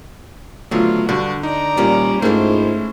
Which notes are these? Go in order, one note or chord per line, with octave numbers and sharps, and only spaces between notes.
D3 D#3 F#3 A3 B3 C4 F4
G2 D3 F#4
D#4 D5 A#5
A#2 D#3 F3 G3 A#3 C#4 G4
G#2 A3 A#3 C#4 E4 F4 C5